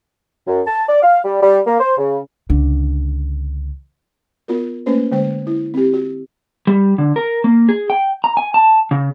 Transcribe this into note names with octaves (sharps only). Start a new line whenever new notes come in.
F#2
A5
D5
F5
G3
G3
A#3
C5
C#3
C#2 D3
B3 F4 F#4 A#4
A3 A#3 C#4 B4 C5
D3 G#3 C5
E4
C4 G4
F#4
G3
D3
A#4
A#3
G#4
G5
A#5
G#5
A5
C#3